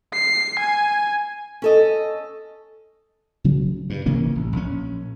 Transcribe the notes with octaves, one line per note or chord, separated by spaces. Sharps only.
C7
G#5
C#4 A4 D#5
C#3 F#3
G2
C3 E3 A#3 C#4
A1
A#1 C#4